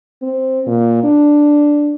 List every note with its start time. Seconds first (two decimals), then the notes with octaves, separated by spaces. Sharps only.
0.22 C4
0.66 A#2
1.03 D4